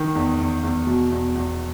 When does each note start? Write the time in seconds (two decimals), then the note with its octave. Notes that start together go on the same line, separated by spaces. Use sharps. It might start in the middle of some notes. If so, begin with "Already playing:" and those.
Already playing: D#3
0.15 E2
0.39 E2
0.63 E2
0.87 B2
1.11 E2
1.35 E2